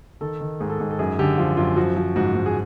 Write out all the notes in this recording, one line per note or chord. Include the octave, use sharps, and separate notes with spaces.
D#3 A4
D#3
G#2 G#4
A4
G#2 G#4
A4
F#2 G#4
D3 G4
F3 F4
F#2 F4
F3 F#4
F3
G#2 F#4
G#2
G#4